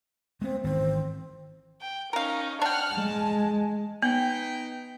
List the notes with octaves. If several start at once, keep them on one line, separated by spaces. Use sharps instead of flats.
G#3 B3 C4
G#1 D#3 E3 C4
G5
C#4 D#4 A#4 F5
D4 F#5 G5 F6
G#3 A5
B3 D#4 B4 G5